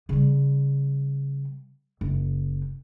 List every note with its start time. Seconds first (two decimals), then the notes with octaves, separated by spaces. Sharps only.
0.09 C#3 G3
2.01 F#1